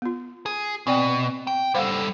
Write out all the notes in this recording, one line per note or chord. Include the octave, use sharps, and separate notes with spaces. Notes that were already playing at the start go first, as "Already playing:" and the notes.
B3 F4
G#4
B2 C4 D5 G5
G5
G3 A4 C5 F5 F#5